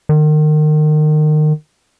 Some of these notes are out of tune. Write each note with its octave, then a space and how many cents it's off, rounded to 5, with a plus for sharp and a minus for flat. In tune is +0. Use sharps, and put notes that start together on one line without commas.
D#3 -30